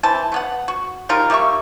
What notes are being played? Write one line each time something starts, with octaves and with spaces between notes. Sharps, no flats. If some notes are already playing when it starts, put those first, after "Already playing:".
E3 C4 A5
A3 B3 F#5
F#4
G3 D#4 F4 A#4
G3 A#3 E5 C#6